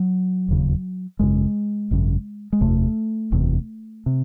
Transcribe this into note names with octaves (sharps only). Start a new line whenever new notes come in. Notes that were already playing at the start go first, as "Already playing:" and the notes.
Already playing: F#3
E1 D#2 C#3
G#1 F#2 C#3 G#3
G#1 F#2 C#3
G#3
F#1 E2 C3 A3
F#1 E2 C3
C3